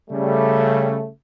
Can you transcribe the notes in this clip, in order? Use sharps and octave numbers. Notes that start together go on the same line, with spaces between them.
C#3 G3 A3